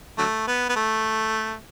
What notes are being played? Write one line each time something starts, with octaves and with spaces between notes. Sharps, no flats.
D3 F#3 A3
B3
B3
A3